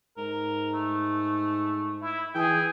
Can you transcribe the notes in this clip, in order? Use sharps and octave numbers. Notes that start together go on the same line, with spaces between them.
G#2 A#4
A3
E4
E3 G#4 G5